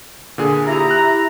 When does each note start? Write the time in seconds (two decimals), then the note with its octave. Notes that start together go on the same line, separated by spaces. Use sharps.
0.38 A#2 D3 G#4
0.67 E4 G4 A#5
0.91 F#6